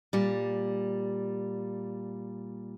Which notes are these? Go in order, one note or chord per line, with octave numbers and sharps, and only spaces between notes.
A#2 G3